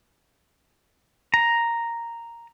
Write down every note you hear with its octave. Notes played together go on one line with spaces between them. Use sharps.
A#5